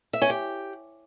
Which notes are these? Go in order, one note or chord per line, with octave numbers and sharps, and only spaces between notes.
E5
C#4
G4